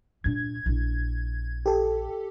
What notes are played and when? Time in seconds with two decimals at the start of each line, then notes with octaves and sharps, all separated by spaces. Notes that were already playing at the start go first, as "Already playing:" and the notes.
0.24 A#2 D4 G#6
0.66 A#1 E4
1.66 G4 A4